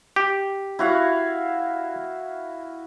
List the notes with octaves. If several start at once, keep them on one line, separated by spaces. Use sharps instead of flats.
G4
E4 F#4 F5